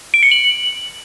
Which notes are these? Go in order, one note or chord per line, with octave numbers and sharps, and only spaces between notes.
D7
C#7
F#7